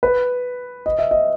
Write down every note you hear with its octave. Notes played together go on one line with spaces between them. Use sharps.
B4
D#5
E5
D#5